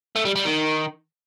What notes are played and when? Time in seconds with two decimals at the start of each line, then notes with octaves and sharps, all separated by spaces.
0.16 A3
0.25 G3
0.35 G3
0.45 D#3